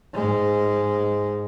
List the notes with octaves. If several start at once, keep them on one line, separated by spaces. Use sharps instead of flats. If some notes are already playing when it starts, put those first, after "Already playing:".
G#2 G#3